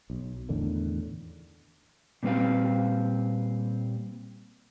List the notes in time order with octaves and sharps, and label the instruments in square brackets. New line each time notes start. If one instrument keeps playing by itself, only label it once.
[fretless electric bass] B1
E2 A2 D3 D#3
[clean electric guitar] A#2 G3 C4 B4 F5